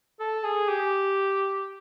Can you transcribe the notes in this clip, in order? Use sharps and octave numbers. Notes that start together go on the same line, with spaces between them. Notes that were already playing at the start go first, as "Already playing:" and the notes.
A4
G#4
G4